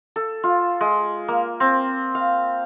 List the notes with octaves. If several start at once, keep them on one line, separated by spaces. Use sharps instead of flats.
A4
F4
G#3
A#3
C4
F5